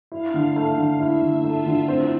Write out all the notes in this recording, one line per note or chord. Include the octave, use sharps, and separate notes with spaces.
E4 F5
D3
A3
D3
E4 E5
D3
A3 F4
D3
C4 E4